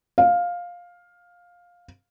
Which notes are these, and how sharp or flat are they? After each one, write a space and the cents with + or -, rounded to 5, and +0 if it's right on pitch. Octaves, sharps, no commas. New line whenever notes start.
F5 +10